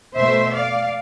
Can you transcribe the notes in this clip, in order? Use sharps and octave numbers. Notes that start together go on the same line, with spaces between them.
B2 A3 C5 E5
D5 F5